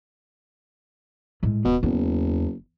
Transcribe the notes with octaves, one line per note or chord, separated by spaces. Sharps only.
A2 G#3
D1 B2
F#1 E2